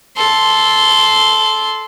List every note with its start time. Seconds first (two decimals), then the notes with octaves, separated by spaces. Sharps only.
0.17 A4 C6